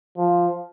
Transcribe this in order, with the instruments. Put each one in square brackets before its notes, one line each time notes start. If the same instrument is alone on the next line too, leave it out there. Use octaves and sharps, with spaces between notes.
[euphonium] F3